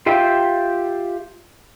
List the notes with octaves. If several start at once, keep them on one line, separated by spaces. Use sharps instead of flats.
F4 G4 E5 F5 G5